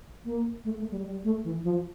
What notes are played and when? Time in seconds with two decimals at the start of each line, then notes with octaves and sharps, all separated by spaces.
0.25 A#3
0.64 A3
0.78 A3
0.91 G3
1.04 G3
1.24 A3
1.44 E3
1.64 F3